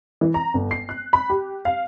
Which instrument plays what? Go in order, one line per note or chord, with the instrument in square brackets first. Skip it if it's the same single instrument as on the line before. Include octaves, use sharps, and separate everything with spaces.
[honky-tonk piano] E3
A#5
G1
C7
F#6
B5
G4
F5